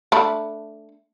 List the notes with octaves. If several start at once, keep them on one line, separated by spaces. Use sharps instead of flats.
A3 D4 B5